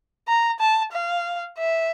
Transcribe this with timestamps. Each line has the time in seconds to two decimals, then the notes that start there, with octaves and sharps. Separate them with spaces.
0.28 A#5
0.59 A5
0.93 F5
1.58 E5